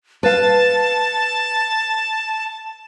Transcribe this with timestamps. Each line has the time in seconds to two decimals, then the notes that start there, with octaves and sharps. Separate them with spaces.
0.23 B4 F5 A5